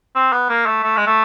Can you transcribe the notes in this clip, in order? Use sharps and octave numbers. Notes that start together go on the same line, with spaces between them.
C4
B3
A#3
A3
A3
G#3
A3